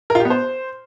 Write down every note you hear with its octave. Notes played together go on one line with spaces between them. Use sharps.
A#4
F4
G4
B3
C5